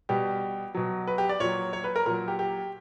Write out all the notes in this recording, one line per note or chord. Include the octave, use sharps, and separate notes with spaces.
B2 G3 G4
B2 F#3
B4
G4
D5
A#2 F#3 C#5
C#5
B4
A#4
A#2 F#3 A#4
G4
G4